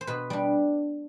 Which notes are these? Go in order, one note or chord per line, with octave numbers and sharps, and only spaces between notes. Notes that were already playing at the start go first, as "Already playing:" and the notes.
C5
B2 B4
G3 D4